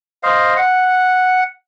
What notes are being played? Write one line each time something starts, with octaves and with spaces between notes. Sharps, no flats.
C5 D#5 F5
F#5